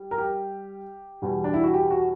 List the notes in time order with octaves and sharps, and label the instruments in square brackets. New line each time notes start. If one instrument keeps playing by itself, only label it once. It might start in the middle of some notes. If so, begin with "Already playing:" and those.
Already playing: [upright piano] G3
A#4
G4
E2 B2 G3
D4
E4
F#4
G4
F#4